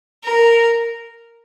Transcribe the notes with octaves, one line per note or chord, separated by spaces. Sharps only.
A#4